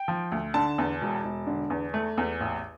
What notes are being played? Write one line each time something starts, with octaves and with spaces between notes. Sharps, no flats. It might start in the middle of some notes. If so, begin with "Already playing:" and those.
Already playing: G5
F3
D2
D3 A5
E2
E1
E1
D3
E2
A3
E2
A1